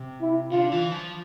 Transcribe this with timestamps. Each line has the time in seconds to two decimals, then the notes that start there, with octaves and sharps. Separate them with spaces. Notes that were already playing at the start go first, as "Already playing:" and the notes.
Already playing: C3
0.21 E4
0.51 D3 F4
0.72 E3
0.92 F3